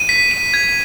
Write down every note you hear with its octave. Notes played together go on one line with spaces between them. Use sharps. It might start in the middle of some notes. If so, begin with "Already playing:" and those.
Already playing: D#7
B6
D#7
G#6